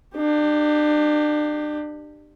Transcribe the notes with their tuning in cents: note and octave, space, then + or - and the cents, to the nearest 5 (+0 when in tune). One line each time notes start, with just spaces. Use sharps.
D4 +35 G4 +0